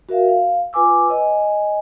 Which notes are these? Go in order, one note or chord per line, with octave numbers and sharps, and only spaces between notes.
F#4 A#4 E5 F5
F5
F4 B4 G#5 D6 E6
C#5 D#5 G#5